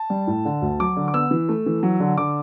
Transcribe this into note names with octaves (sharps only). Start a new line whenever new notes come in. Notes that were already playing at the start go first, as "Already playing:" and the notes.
Already playing: A5
G3
A2
D3
D2
F#3 D6
D3
D6
B3 E6
E3
A3
E3
F#3
D3
D3 D6